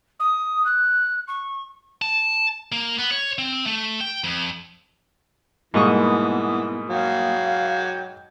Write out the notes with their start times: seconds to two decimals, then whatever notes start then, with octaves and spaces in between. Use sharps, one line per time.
0.19 D#6
0.65 F#6
1.27 C#6
2.02 A5
2.72 A#3
2.98 B3
3.11 C#5
3.38 C4
3.66 A3
4.00 G5
4.24 F2
5.74 G#2 B2 E3 G3 A#3 B3 C#6 D#6
6.90 F#3 F5 G5